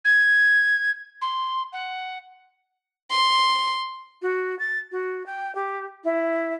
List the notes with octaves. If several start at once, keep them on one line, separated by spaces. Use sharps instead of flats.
G#6
C6
F#5
C6
F#4
A6
F#4
G5
G4
E4